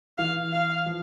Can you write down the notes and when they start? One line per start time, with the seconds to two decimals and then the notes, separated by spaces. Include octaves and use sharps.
0.18 E3 F5
0.53 F5
0.86 F3